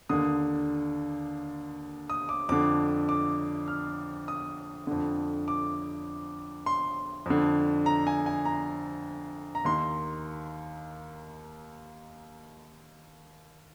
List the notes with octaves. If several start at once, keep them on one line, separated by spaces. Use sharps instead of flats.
D#2 D3 D#6
D#6
D6
F2 D3 D6
D6
F6
D#6
F2 D3
D6
C6
F2 D3
A#5
G#5
G#5
A#5
A#5
D#2 D#3 C6